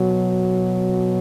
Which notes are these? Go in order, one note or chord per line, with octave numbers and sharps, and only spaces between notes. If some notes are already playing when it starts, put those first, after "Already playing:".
Already playing: B2 F#3